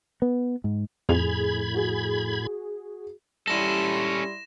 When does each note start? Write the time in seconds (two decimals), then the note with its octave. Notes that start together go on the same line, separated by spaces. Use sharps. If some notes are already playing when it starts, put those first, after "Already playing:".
0.22 B3
0.64 G#2
1.09 F2 A2 G#4 B5 G#6 F7
1.74 F#4 G#4
3.48 G3 C#4 E4 A4 C6 A#6 E7